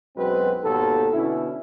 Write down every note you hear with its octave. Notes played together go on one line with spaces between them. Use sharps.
B1 F#2 F#3 G#3 C4 B4
G#1 D#2 B2 B3 A4
B2 D3 C#4 E4